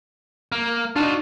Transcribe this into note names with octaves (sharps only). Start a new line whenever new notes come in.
A#3
D4 D#4 F4 F#4